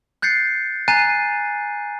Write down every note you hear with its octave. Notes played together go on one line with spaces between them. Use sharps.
F#6 G6 A6 C7 C#7
G#5 A#5 F#6 A6 C7 D#7